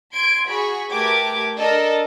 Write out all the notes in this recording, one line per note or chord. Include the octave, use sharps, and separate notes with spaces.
C6 G#6 D7
F#4 G#4 B5 C#6
A3 G4 A#4 B4 D6 G#6
D4 A4 A#4 D#5